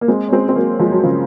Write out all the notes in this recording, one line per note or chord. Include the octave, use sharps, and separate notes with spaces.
A#3
G#3 C4
C#4
G#3 C4
C4
F#3 A#3
F3 G#3
F#3
C#3 F3